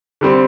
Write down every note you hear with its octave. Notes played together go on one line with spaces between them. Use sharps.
D3 G3 C4